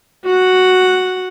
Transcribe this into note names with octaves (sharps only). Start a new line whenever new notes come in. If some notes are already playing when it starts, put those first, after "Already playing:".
F#4 F#5